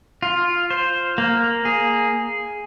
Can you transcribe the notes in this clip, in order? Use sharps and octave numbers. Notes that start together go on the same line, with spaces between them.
F4
C5
A#3
G#4